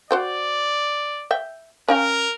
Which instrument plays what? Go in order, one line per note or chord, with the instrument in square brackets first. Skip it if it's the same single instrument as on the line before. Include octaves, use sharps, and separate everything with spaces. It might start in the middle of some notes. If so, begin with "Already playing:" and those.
[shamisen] F#4 C5 G5 [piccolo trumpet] D5
[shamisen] E5 G5
[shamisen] C#4 F5 G5 [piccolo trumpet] A#4